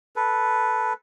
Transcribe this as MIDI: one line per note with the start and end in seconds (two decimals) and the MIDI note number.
0.16 0.93 69
0.16 0.93 71